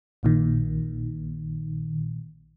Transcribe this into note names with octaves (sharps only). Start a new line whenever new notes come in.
A#1 A#2 D#3